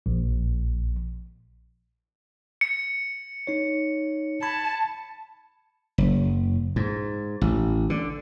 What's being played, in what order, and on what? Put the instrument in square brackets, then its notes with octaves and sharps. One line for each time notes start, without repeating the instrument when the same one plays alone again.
[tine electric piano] A#1
[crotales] C#7
[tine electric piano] D#4 C#5
[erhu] A5 [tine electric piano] B5 G#6
[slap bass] F#1
G#2
A1
D3